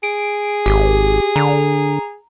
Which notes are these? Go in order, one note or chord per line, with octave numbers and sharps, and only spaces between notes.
G#4 D7
G#1 G4
D3 A#5